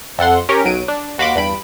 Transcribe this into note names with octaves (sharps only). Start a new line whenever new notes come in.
F2 A4 F#5 C6
C#4 G4 A#4 C#5
B1 F#3 D7 D#7
D4
D#2 F#4 F5 B5 C6 D6
E2 G2 B5 D7